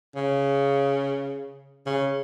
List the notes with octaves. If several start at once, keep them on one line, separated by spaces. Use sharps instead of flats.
C#3
C#3